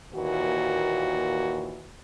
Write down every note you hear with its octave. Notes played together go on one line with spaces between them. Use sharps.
D#2 A#2 E3 F#4